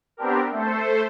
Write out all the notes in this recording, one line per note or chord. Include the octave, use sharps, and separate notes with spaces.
B3 C4 D4 G4 A#4
A3 A4 C5